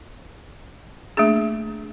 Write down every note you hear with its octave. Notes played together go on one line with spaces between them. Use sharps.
A3 A#3 D4 G#4